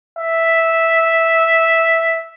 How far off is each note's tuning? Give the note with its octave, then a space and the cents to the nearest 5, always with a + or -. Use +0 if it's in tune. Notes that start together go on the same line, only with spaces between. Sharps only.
E5 -5